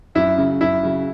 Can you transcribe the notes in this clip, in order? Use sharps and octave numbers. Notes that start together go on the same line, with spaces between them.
F#2 E4
C#3 F#3
F#2 E4
C#3 F#3